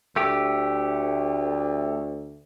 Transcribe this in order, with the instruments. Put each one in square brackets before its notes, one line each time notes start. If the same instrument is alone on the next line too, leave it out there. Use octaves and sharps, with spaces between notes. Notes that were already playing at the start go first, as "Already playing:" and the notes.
[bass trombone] D2 [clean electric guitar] A3 G4